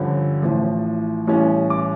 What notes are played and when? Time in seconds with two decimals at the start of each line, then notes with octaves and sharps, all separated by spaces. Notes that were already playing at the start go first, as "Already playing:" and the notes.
Already playing: G2 D3 F3 C#4
0.42 A1 A2 F3
1.27 A1 A2 G3 C#4
1.70 D6